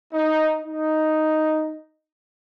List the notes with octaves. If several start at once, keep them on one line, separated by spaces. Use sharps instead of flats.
D#4
D#4